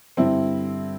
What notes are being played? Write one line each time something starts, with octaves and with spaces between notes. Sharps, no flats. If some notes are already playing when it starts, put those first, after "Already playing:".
G2 D3 C4 E4